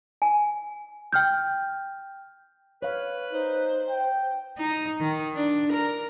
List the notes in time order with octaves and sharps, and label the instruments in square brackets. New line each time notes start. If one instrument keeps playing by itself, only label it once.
[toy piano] G#5
[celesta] G5 F6 G6
[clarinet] B4 [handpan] C#5 F5
[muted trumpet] D#4 [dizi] C5
[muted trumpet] G5
[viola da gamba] D#4
D#3
D4
A#4